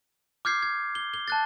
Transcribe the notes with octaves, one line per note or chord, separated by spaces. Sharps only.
D6 F6 G6 G#6 C7
G#6
G7
G7
A5 F#6 A6